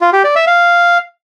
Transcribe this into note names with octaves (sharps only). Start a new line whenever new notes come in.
F4
G4
D5
E5
F5